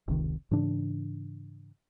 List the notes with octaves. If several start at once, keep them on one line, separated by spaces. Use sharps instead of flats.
F1 C#2 C3 D#3
G#2 C#3 E3 D4